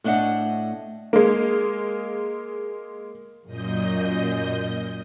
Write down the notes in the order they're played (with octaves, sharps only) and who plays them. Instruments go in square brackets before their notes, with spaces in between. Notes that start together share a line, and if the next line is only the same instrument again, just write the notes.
[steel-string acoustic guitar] A2 A3 D4 D#5 F#5
[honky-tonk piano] G#3 A#3
[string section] F#2 [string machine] A#2 D#5 G6